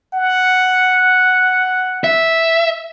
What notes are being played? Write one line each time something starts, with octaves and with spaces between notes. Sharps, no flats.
F#5
E5